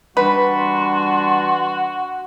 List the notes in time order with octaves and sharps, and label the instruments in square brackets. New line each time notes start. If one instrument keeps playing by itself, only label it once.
[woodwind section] E3 G3 D4 [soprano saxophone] F#4 [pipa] B4 [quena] C6